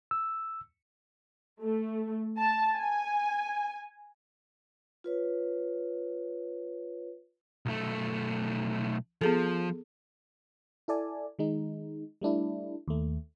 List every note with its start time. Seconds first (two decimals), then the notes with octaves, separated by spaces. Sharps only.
0.11 E6
1.60 A3
2.38 A5
2.76 G#5
5.04 F4 B4 C#5
7.66 B1 A3
9.21 F3 B3 G#4 A4
10.88 E4 A4 D5 G#5
11.39 D#3 G#3 D#4
12.21 G3 A3 D4 E4
12.88 D#2 A3